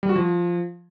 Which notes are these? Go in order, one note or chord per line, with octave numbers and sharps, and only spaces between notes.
G3
F#4
F3